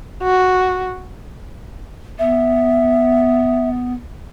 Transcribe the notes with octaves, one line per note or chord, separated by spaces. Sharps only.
F#4
B3 E5